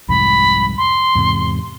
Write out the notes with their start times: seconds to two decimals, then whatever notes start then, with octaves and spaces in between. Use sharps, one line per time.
0.09 C2 F2 G#2 B5
0.78 C6
1.15 E2 G#2 C3